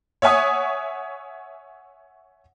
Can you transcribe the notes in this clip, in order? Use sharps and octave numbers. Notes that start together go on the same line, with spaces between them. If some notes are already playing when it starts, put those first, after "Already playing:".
C#5 E5 F#5 G#5 C#6 D#6